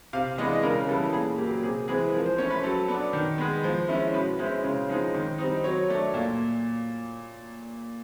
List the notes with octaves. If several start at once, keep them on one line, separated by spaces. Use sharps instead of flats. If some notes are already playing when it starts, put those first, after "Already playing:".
C3 F5
E3 G#3 B3 D4 D#5
C#3 A#4
E3 G3 B3 A4
A#2 G#4
F#3 A#3 G4
C3 G#4
E3 G#3 C4 G#4
F3 A#4
C5
A3 C#4 C#5
B4
F#3 A4
B3 D4
D#3
G#3 B3
F3
G#3 C#4 E4
B2 B4
G#3 C#4 E4 C5
C#3
F3 G#3 C4 D#4
D#3
G3 C4 D#4
F#3 C#5
A3 D4
A#2